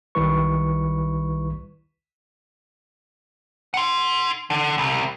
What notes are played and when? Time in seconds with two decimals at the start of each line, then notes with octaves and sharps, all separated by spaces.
0.15 B1 D#3 G3 E4 B4 C#6
3.74 F#5 C6
4.50 D3
4.78 C2